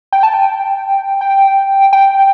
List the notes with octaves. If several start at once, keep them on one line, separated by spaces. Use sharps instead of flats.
G5
A5
G5
G5
G5